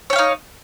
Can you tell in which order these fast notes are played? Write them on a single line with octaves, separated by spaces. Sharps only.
C#5 G5 F5 D#4